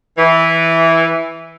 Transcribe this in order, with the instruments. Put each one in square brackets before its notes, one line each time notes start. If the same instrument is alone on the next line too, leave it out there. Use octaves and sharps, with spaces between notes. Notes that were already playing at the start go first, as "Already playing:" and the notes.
[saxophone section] E3